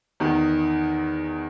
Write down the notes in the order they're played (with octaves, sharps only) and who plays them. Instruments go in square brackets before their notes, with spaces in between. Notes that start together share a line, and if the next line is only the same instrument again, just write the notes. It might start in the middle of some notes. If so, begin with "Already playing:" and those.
[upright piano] E2 D#3